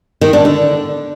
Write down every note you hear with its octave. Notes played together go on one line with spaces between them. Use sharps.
D#3
D4
D3